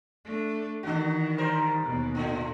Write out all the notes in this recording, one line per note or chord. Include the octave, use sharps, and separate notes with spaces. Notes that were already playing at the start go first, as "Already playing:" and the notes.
A3 D4
D#3 E3 D4 F#4
G3 A#4 C5
D#2 B2
A2 D3